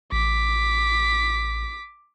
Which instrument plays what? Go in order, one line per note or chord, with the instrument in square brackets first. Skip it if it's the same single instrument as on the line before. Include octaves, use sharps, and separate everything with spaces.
[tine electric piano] A1 [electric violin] D6 B6